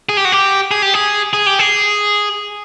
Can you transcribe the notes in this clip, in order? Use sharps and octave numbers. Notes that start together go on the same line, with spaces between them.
G#4
G4
F#4
G4
G#4
G4
G#4
G#4
G4
G#4